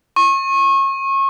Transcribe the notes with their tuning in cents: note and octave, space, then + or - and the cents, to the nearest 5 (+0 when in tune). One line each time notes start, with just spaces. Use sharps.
C#6 -30